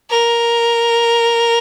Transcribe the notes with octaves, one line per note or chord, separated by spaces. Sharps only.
A#4